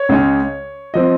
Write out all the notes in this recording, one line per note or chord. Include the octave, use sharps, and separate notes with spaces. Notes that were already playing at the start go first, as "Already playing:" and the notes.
Already playing: C#5
C#2 C#3 G#3 C#4
F3 C4 D#5